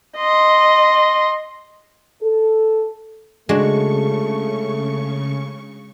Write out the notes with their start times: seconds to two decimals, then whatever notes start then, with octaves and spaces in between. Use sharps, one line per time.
0.17 D#5 C6
2.21 A4
3.49 C#3 G#3 A3 D4 F#4 C#6